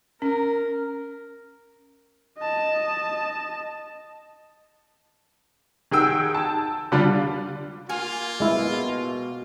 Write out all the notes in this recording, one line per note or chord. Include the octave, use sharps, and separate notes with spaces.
C#4 A#4
D#5 A5
D#3 G#4 F#5 G5 E6
A5
D3 G3 D4 F4
A#3 F4 G#5 F6
B2 G#3 E4